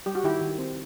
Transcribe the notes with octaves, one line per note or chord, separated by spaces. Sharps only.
G3 G4
F#4
D#3 E4 G4
D#3
C4